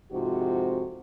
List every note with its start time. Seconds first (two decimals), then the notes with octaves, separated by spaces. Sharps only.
0.12 F2 G#2 C3 F4 F#4